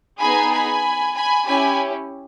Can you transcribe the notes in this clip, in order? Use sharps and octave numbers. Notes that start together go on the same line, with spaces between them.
B3 D#4 G#4 G#5 B5
G#5 B5
G#5 B5
C#4 E4 G4 G#5 B5